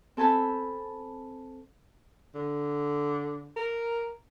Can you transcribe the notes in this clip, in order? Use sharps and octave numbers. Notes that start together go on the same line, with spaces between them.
C4 A4 G#5 A5 B5 G6
D3
A#4